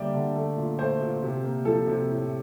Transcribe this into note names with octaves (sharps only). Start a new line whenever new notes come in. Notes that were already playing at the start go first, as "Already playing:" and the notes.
Already playing: D3 G3 A#3 D5 E5 G5
D3
A3
A#2
A3 C5
A#2
C3
A#3
F3 A4
C3
A2